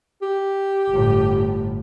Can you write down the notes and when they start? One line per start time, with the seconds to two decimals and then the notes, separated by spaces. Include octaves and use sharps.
0.22 G4
0.90 G1 A2